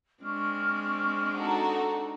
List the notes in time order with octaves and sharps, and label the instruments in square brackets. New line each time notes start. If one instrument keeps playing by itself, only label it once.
[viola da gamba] G#3 C4 D4 [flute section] C#6 F6
[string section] D#4 F#4 A4 [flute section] A#5